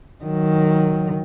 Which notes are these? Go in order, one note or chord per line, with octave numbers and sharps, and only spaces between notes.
D#3 F#3